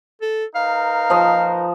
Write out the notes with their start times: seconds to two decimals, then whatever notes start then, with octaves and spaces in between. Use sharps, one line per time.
0.22 A4
0.55 D#4 A#4 B4 F5
1.10 F3 D#5